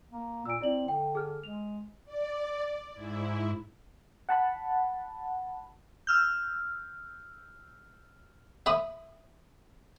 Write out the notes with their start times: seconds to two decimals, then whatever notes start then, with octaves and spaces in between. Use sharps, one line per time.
0.11 A#3
0.45 A#2 E6 D7
0.61 C4 E4 D5 F#7
0.88 D3 G5
1.15 G#4 F6
1.44 G#3 F7
2.05 D5
2.93 G#2 E4
4.29 F#5 A5 B5
6.07 E6 F6 G6
8.66 E5 B5 D#6